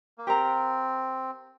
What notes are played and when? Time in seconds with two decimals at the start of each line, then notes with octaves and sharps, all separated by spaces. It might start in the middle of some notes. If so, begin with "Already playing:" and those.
0.18 A#3
0.27 C4 G4 A#4 F5 A#5